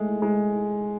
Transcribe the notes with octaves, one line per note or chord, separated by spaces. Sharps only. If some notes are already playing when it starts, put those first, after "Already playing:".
Already playing: G#3 A3
G#3